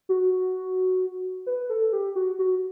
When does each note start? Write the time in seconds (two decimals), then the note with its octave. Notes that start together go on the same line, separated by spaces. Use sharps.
0.09 F#4
1.46 B4
1.70 A4
1.93 G4
2.15 F#4
2.39 F#4